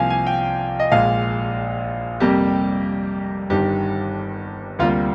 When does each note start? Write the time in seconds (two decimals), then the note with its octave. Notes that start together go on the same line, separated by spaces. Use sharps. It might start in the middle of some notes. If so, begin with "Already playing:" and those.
Already playing: C2 C3 F3 A#3 F5 G#5
0.10 G#5
0.27 G5
0.80 D#5
0.92 A#1 A#2 G#3 F5
2.20 F2 C3 G3 A#3 G4
3.50 G1 G2 D#3 G4
4.79 D2 C3 G3 A#3 F4